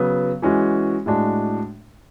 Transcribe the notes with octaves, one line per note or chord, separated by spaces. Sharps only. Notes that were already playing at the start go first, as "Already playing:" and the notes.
Already playing: C#3 F#3 B3
E3 G#3 C#4 F#4
A2 G#3 D4 F#4